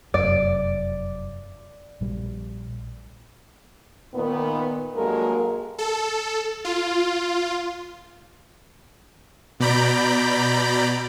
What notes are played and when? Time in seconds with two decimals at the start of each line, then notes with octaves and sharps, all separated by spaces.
0.14 F1 F#2 D5
2.01 A#1 G3
4.14 A#2 D#3 B3
4.95 G2 F#3 G#3 A#3 A4 A#4
5.78 A4
6.65 F4
9.60 B2 D5 A#5 B5 G6 D7